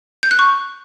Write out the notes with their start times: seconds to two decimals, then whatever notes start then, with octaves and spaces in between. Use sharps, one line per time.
0.23 G6
0.31 F#6
0.39 C#6